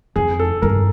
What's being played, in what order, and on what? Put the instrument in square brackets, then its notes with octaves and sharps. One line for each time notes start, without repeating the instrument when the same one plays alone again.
[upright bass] F2 [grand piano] G#4
[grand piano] A4
[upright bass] G2 [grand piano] A#4